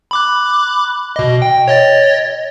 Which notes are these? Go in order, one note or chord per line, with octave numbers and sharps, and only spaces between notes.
B5 D6 F#6
B2 D#5
G5
C#5 D#5 A6